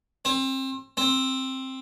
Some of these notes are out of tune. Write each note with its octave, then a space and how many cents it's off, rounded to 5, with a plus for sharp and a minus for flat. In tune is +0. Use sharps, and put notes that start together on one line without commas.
C4 +30
C4 +10